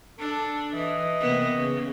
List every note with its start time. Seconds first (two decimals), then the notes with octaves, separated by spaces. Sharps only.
0.19 D4 A4
0.74 E3 D#5
1.20 C3 A#3 B3
1.54 C#3